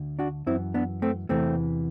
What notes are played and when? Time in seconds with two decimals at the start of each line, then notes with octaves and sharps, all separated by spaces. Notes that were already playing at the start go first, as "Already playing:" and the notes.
Already playing: D2 D3
0.19 D4 F#4
0.46 F#2 E3 C4 E4
0.74 B3 D4
1.02 A3 C4
1.29 E2 C3 E3 A3 C4